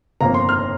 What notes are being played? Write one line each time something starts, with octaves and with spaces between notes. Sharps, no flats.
G1 F2 F3 A#3 A#5
C6
F6